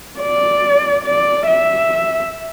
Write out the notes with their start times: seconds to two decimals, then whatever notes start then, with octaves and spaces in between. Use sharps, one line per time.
0.20 D5
1.04 D5
1.47 E5